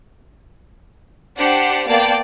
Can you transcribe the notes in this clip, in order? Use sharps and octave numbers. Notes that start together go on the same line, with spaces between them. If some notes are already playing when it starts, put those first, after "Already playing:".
D4 G4 C5 F#5 G5
A#3 B3 D5 F5 G5 A5